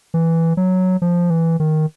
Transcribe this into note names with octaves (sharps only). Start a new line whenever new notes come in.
E3
F#3
F3
E3
D#3